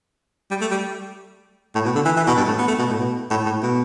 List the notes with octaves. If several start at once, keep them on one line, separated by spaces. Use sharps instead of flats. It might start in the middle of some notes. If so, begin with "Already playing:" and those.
G3
A3
G3
A2
B2
D3
E3
E3
B2
G2
A2
B3
A3
B2
A2
B2
A2
A2
B2